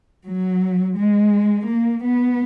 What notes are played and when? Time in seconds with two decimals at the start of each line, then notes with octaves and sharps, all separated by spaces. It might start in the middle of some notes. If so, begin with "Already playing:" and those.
0.25 F#3
0.96 G#3
1.68 A#3
2.03 B3